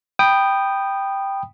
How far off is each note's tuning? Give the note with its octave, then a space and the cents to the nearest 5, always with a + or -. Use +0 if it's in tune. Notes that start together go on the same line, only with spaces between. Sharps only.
G5 +0 B5 +0 D#6 -15